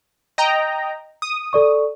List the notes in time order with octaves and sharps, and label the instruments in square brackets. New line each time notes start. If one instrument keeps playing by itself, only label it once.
[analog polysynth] D#5 G5 A#5
D#6
[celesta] A4 D5 C#6